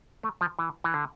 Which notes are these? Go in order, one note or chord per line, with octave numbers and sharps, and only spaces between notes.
A3
F3
E3
E3
D3